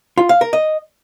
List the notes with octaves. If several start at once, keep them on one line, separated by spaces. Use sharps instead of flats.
F4
F5
A#4
D#5